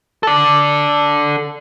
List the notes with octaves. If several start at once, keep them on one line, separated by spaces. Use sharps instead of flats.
A4 D5